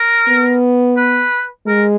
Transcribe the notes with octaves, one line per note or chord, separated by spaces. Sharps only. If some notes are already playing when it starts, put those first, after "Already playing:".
Already playing: A#4
B3
B4
G#3 A#4